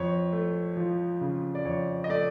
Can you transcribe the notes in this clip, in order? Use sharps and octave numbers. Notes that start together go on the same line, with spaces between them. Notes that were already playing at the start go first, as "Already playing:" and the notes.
Already playing: F2 C#5
A3
F3
C#3
D5
F2 C#5
D#5
A3 D5